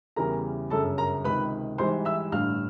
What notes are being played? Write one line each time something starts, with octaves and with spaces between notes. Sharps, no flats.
E2 C#3 E3 G3 A#4 A#5
G1 F#2 C#3 A4 A5
A#4 A#5
C#2 C3 D#3 B4 B5
G#1 G#2 E3 G3 C5 C6
E5 E6
A1 G2 D3 F5 F6